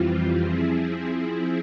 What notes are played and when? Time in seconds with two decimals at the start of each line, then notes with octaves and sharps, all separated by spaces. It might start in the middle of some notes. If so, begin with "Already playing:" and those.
Already playing: F2 E3 G3 C4 F4
0.41 F3 C4 E4 G#4